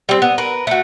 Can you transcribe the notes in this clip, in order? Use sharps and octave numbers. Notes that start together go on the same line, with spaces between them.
G3 C4
B3
A#4 B4
A3 F#4